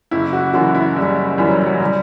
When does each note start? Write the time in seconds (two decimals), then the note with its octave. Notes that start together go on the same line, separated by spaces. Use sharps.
0.11 F#1 E4
0.33 F#4
0.54 F#2 E3 F#4
0.75 E4
0.96 F#1 G3
1.38 F#2 E3 G3
1.48 F#3
1.66 F#3
1.80 G3